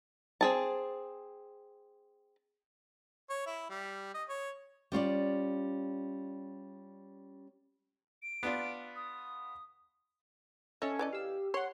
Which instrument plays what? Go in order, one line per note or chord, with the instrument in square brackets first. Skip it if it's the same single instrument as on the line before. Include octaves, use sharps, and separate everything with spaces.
[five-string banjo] C4 G#4 A5
[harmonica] C#5
E4
G3
D#5
C#5
[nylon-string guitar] G3 C#4 F4 D5
[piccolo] D7
[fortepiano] B3 D4 F4
[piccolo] D#6
[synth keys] C#4 A4 C#5 [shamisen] D#5 E5
[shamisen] E3 D5 D#5
[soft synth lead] G4 [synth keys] F5 E6
[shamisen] C#5 [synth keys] F#5 C6